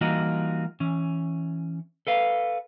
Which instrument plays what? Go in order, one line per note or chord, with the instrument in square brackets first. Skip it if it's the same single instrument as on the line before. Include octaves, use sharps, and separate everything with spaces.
[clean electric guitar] E3 G3 A#3 D#4 F4 F#4
E3 C#4
A4 B4 F5